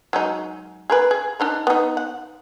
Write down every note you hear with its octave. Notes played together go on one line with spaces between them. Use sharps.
F#3 G#3 D#4
G#4 A#4 B4
G#4
D4 D#4 A#4
B3 D#4
F#5